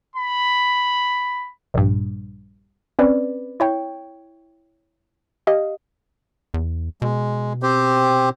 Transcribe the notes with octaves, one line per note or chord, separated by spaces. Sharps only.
B5
A#1 G2
C4 C#4 B4 D5
E4 C#5 G5
G4 D#5 F5
E2
B2 G#3
C4 G4 C5